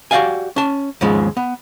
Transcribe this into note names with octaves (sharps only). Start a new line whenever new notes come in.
F#4 G4 D5 F5 G#5
C#4 A5
D#2 G#2 C#3 F3 G#3
B3